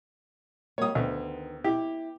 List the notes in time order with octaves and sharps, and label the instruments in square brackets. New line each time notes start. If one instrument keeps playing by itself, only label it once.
[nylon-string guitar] G3 A#3 [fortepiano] C#5 D#6
[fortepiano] D2 [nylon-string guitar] D#3 B3
[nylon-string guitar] E4 [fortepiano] G4